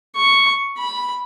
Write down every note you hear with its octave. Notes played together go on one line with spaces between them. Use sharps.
C#6
B5